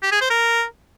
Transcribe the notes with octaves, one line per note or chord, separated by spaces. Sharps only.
G4
G#4
C5
A#4